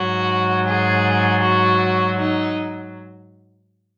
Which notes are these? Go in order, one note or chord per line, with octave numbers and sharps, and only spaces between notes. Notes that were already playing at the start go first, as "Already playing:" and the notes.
Already playing: G#2 F#3 F#4
G#4
F#4
D#4